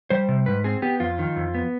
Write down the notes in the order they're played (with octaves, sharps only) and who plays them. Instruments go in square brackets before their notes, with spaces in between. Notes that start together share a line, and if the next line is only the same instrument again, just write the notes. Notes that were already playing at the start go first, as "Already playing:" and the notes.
[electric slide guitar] G3 C5
C3
G#2 B4
C4 G#4
B3 G4
F2 F4
D#3
F2
B3